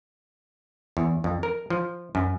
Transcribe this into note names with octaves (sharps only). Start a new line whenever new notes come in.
E2
F2
A#4
F3
F#2